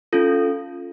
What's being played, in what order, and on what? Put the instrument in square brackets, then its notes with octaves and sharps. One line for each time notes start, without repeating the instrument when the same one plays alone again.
[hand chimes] C#4 F4 A4